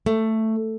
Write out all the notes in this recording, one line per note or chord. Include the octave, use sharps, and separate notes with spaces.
A3